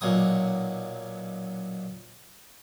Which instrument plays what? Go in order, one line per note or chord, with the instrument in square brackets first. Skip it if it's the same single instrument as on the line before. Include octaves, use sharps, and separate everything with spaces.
[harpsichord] B1 A#2 F#3 D#6